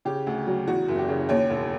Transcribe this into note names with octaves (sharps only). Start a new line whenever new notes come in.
C#3 G4
D2
F#3
E2 F#4
F#1
G4
C#3
D#2 C#5
E1